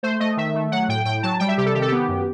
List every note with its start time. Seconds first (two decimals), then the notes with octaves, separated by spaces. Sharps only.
0.03 A3 C5
0.20 A3 D#5
0.37 D#3 E5
0.55 A3
0.72 F#3 F#5
0.88 A2 G5
1.05 A2 G5
1.23 F#3 A5
1.39 G3 G5
1.48 E5
1.58 C3 G4
1.66 A4
1.74 D#3 G4
1.82 A4
1.88 B3 G4
2.08 F#2